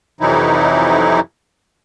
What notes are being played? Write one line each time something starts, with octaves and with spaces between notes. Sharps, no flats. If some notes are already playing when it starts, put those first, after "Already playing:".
F2 C3 E3 F#3 D#4 E4